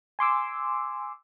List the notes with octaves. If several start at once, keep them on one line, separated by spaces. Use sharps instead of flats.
G#5 C6 D6 E6